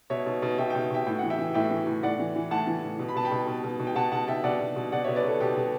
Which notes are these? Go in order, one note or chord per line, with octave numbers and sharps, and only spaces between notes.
B2 C#5 E5
B2
B2
B2 E5 G5
E5 G5
B2
B2 E5 G5
A2 G5
E3 F#5
E5 G5
E3
A2 E5 G5
E3
A2
A2 D5 F#5
E3
E3
A2 F#5 A5
E3
A2
B2
B5
B2 A5
G5 B5
B2
B2
B2
B2
G5
B2 F#5 A5
B2 F#5 A5
B2 E5 G5
B2 D5 F#5
B2
B2
B2 D5 F#5
C#5 E5
B2
B4 D5
B2 A4
B2 G4
B2